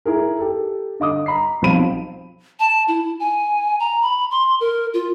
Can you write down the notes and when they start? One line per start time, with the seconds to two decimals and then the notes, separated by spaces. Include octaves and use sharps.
0.05 E4 G#4 A#4
0.39 G4 A4
1.00 D3 D#5 D6 D#6
1.26 A#5 B5 C7
1.62 B1 F3 C4 B5 D#7
2.60 A5
2.88 E4
3.20 G#5
3.80 A#5
4.02 B5
4.31 C6
4.60 A#4
4.94 F4